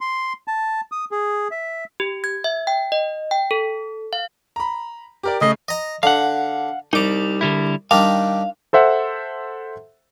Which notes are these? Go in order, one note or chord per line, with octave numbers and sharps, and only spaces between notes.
C6
A5
D#6
G#4
E5
G4
G#6
E5
G5
D#5
G5
A4
F5
A#5 B5
G4 A#4 D5
C#3 A3 D#5 C7
D#5 A#5
D3 F5 F#5
C2 G3 D#4 D6
D3 G3 E4
D#3 G3 D4 F5
A4 C5 E5 F#5